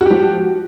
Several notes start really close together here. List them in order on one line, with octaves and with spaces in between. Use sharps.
F#4 G4 F3